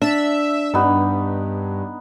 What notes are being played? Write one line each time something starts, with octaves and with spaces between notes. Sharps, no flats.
D4 E5 E6
G2 B3 D#4